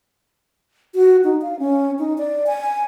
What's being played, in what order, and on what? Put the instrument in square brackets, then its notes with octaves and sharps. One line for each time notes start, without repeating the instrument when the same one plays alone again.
[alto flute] F#4
D#4
F5
C#4
D#4
D5
G#5